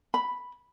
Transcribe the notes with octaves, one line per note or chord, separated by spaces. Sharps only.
B5